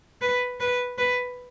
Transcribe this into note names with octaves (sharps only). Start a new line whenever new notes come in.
B4
B4
B4